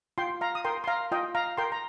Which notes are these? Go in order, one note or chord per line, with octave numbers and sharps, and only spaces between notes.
F4 G5 C6
F5 A#5
D#6
A#4 G5 C6
C6
F5 A#5
F4 D#5 G5
F5 A#5
A#4 G5 C6
A#5